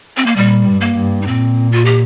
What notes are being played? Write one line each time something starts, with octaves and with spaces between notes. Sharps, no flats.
C4
A#3
A#2 G3
G2
A#3
G2
D#4
A#2 C4
F4
G4